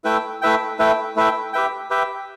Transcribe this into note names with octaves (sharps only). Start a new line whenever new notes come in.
A3 E4 B4 E5 G5
A3 E4 B4 E5 G5
A3 E4 B4 E5 G5
A3 E4 B4 E5 G5
G4 B4 E5 G5
G4 B4 E5 G5